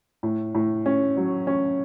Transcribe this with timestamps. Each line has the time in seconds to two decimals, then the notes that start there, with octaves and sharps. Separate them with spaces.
0.23 A2
0.55 A2
0.86 C#4
1.17 F#3
1.47 C#4